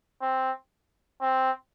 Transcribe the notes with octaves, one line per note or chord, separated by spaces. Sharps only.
C4
C4